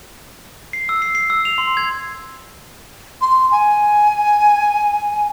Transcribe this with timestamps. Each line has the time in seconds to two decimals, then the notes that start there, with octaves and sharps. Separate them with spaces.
0.73 C7
0.89 E6
1.02 C7
1.15 C7
1.30 E6
1.45 F7
1.58 C6
1.77 G#6
3.21 C6
3.51 G#5